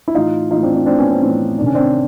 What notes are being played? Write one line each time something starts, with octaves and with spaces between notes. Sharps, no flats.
E4
A2 E3 D#4 F4
A2 E3 D#4 F4
C4 D4
C4 D4
A2 E3 C4 D4
B3 C#4
C4
A2 E3 C4
C3 D#3 C#4 D4
C4 D4